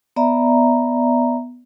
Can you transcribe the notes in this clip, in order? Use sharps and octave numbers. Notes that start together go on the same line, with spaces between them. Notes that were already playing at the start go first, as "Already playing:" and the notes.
B3 D5 E5 A#5